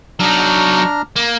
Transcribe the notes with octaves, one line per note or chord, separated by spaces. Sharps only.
F#3 D4 D#4 A#5 F6
A#3